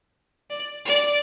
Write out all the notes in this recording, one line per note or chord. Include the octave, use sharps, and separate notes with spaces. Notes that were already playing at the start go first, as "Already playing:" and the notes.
D5
D5